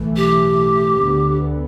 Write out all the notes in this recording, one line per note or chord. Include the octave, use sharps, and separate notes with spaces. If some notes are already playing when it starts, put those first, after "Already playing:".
Already playing: B1 A2 E3 A3
G4
D2 D3 B3